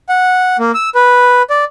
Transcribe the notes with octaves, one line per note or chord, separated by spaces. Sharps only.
F#5
A#3
E6
B4
D5